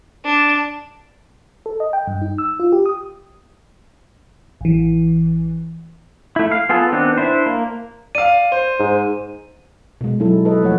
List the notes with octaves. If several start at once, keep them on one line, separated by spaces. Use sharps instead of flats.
D4
A4
D#5
G5
G2
D#4
E6
F4
G4
D#6
A1 E3
A3 E4
F5
B3 F4 G#4 A4
D#3 B3 C4 D4
D4 E4 C5
A#3
D5 F5 D#7
C5
G#2
B2 G#3
F#3 D#4 E4 A4
A4 B4 D#5
F3 A3 C#5 F#5